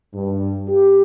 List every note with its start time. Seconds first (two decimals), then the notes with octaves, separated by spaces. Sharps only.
0.14 G2
0.68 G4